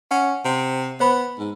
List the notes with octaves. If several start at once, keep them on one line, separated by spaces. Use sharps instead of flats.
C#4 F#5
C3
B3 C5 B5
G#2